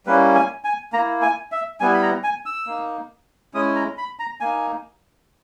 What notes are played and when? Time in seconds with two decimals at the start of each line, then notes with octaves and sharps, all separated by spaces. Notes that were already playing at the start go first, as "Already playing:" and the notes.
0.06 G3 A#3 C#4 E4 B4
0.35 G#5
0.64 G#5
0.93 A#3 A#5
0.98 E4
1.22 G#5
1.52 E5
1.80 G3 B3 E4 G#5
1.94 B5
2.02 A#5
2.24 G#5
2.46 E6
2.67 A#3 D#4
3.54 G#3 C#4 E4 D#6
3.76 A#5
3.98 B5
4.19 A#5
4.41 A#3 D#4 G#5